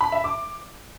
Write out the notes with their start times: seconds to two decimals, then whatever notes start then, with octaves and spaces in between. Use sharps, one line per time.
0.01 B5
0.12 E5
0.24 D6